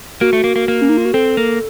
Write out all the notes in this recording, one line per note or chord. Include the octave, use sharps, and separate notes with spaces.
A#3 F#4
A3
A#3
A#3
A#3
C#4
D#4
F4
F#4
C4 A4
A#3